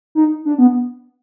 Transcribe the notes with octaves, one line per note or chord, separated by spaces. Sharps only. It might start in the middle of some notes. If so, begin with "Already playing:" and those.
D#4
D4
B3